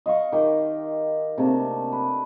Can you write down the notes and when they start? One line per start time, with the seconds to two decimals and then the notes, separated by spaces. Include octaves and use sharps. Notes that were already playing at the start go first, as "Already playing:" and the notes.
0.06 D#5 F5 C#6
0.32 D#3 G4 D#5
1.38 C3 A3 A#3 D4
1.92 B4